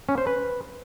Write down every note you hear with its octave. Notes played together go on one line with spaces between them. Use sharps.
C#4
C5
B4